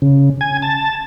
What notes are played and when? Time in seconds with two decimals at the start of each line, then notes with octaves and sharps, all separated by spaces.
0.02 C#3
0.41 G#5
0.62 A5